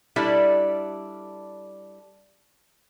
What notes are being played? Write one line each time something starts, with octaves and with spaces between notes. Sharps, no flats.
G3 D4 E4 A4